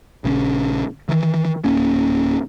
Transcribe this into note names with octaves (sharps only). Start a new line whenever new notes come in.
A#1 C#3 G#3 C#4
D#3 E3
D1 A#3 C#4